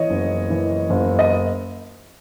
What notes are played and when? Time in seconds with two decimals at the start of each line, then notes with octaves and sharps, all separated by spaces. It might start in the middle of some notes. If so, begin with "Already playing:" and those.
Already playing: E3 C#5 D#5
0.10 F#1
0.50 E3
0.90 F#1
1.19 D#5